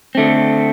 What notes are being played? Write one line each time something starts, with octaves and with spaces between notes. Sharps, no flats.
D3 A3 C4